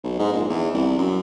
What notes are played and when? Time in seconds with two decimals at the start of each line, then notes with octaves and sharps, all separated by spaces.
0.04 B1
0.19 G#2
0.33 A#1
0.50 E2
0.74 C2
0.99 F#2